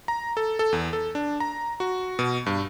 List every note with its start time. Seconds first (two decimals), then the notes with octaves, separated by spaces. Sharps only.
0.08 A#5
0.37 A4
0.59 A4
0.73 E2
0.93 A4
1.15 D4
1.40 A#5
1.80 F#4
2.19 B2
2.46 G2